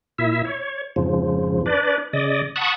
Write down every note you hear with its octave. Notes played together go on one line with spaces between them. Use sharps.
A#2 E4 E5
C#5
F2 G#2 C#3 F3
D4 B4 D5
C#3 D5 D#5
F#5 A5 B5 C#6 D#6